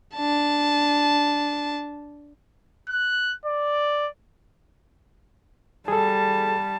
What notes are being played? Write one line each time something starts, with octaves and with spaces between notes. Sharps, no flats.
D4 A5
F#6
D5
G3 G#4 A4 A5